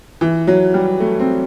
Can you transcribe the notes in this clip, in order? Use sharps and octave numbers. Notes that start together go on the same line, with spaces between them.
E3
F#3
G3
A3
C4